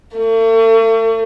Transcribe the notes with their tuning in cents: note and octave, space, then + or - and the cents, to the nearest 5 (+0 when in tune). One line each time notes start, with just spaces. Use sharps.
A3 +40